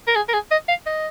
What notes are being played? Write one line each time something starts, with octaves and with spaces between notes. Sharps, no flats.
A#4
G#4
A#4
G#4
D#5
F5
D#5